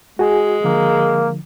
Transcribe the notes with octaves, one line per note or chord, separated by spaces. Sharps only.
G#3 F#4 G#4 G#5
D3 F3 A#3